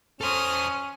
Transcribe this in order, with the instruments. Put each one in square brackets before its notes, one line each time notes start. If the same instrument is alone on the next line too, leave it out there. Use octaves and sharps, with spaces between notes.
[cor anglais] C#4 [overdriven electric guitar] A4 C5 [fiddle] D#6 F6